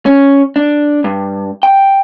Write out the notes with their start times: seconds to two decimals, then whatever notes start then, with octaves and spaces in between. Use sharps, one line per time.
0.06 C#4
0.56 D4
1.04 G2
1.63 G5